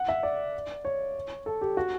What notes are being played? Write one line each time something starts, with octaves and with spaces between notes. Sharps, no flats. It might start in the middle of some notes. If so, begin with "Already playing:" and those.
Already playing: F#5
E5
D5
C#5
A4
G4
F#4